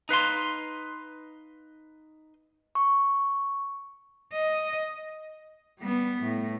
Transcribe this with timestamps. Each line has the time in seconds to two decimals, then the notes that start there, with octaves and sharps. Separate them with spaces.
0.09 D#4 B4 F5 C6
2.75 C#6
4.33 D#5
5.79 G3 B3
6.23 A2